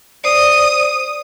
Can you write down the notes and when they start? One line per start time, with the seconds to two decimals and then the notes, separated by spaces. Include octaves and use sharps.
0.24 C5 D5 D#6